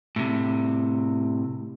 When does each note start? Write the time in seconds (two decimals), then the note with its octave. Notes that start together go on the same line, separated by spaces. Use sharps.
0.16 A2 C3